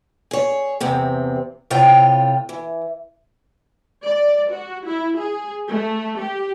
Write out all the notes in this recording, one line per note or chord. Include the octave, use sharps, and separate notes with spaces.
G#4 C#5
E2 C3 C4
A2 C3 F4 C#5 G5
E3
D5
F#4
E4
G#4
A3
G4